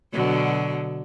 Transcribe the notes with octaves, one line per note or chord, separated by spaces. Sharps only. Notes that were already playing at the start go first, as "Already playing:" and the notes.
B2 D3 F#3